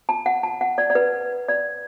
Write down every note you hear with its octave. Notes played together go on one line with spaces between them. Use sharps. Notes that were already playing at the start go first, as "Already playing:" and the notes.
A5
F#5
A5
F#5
D5
D5
B4
D5